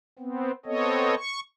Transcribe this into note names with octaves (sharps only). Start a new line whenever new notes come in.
B3 C4
B3 C4 A4 C#5 D#5
C#6